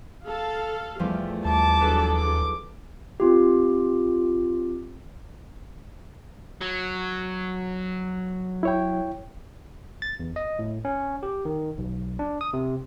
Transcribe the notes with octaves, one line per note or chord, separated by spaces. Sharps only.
A4 F5
E2 F3 G3 A3
D#2 A5 D6
F#3 D4 G#4 A4 B4 E7
D6
C4 F4 G4
F#3
E4 C#5 G5
A6
E2
D#5
A2
C#4
G4
D#3
B1
D4
D#6
C3